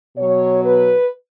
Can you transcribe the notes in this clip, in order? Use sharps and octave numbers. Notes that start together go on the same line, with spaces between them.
B2 F#3 C#5
B4